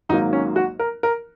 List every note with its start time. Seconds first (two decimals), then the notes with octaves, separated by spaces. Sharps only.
0.09 G#1 G#2 F#3 A#3 D#4
0.33 C#4
0.56 F#4
0.79 A#4
1.03 A#4